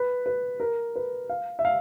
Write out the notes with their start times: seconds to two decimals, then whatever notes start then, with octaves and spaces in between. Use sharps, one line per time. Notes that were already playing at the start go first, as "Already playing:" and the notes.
Already playing: B4
0.26 B4
0.60 A#4
0.96 B4
1.29 F5
1.59 E5
1.65 F5